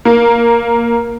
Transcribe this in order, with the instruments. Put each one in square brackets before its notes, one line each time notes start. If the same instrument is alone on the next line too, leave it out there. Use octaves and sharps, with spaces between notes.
[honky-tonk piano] A#3